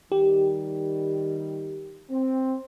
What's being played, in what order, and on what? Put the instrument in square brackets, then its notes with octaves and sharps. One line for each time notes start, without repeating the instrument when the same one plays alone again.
[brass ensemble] D#3 G3 [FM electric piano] G4
[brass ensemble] C4